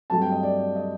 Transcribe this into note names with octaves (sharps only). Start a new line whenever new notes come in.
G2 F#3 A3 C4 A5
G5
D#5
D5
D5
D#5